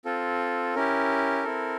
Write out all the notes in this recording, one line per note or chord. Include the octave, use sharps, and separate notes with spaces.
C4 F4 A4
C#4 E4 G4 A#4
C4 E4 A4